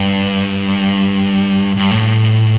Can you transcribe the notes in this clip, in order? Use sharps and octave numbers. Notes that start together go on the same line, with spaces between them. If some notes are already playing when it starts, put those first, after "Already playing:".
Already playing: G2
G2
A2